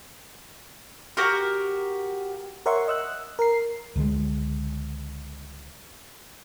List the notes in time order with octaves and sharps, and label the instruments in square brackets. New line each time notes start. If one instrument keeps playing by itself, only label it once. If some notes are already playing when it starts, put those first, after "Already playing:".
[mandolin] F#4 G4 A#4
[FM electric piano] A#4 C#5 E5 F#5 C6 C#6
D#5 E6 F#6
A#4 C7
[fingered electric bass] C#2 D3 D#3 G#3